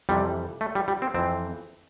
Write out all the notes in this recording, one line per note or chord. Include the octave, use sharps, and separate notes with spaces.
F2 C3 E3 G3
A3
G3
G3
C4
F2 E3 C4